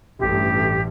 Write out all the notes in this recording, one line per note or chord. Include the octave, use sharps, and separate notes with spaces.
A1 G2 G4